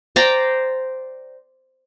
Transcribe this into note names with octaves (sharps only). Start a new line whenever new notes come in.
C5 D5 G5 A#5